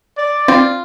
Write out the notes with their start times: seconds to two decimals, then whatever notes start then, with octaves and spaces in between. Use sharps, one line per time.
0.17 D5
0.48 C4 F4